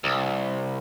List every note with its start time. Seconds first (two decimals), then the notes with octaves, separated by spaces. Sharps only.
0.04 C2